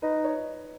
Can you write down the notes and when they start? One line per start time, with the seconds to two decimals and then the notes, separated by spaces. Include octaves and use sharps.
0.02 D#4 B4
0.24 C#5